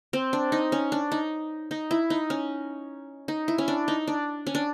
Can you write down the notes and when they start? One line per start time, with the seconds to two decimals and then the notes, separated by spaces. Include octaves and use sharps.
0.13 C4
0.33 D4
0.52 D#4
0.72 C#4
0.92 D4
1.12 D#4
1.71 D#4
1.91 E4
2.10 D#4
2.30 C#4
3.28 D#4
3.48 E4
3.58 C#4
3.68 D4
3.88 D#4
4.07 D4
4.47 C#4
4.55 D4